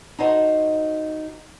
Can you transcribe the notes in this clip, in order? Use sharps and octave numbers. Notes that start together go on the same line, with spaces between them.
D#4 F#4 A4 C5 C#5 D#5